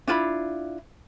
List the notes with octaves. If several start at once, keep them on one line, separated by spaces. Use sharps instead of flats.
D4 E4 F4 B5